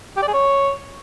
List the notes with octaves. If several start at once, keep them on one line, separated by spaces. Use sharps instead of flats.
G4
D5
G#4
C#5